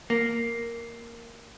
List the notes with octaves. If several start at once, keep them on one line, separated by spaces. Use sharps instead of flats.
A#3